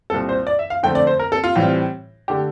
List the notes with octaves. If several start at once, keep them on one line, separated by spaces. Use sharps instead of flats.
C2 A#2 G3 C4 A4
C5
D5
E5
F5
F2 D3 A3 C4 G5
D5
C5
A#4
A4
F4
A2 E3 G3 C4
D3 A3 G4